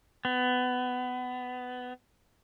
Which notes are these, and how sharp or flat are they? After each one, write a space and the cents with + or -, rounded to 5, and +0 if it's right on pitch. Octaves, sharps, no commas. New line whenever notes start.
B3 +20